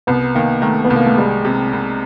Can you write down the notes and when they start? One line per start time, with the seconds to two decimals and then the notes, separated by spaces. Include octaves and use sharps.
0.07 C2 B3
0.35 D#3 A#3
0.62 D#3 A3
0.85 B3
0.90 C2
0.96 A#3
1.06 A3
1.17 G3 G#3
1.45 C3
1.73 C2